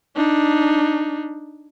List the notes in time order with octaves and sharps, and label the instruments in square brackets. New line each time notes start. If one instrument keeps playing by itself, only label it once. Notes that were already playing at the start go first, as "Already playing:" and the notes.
[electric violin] D4 D#4